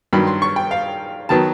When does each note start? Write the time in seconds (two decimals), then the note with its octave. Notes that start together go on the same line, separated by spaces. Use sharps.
0.13 G2 D#3 F#3 B5
0.27 C6
0.42 C#6
0.56 G5
0.71 F5
1.29 D#3 F#3 B3 A5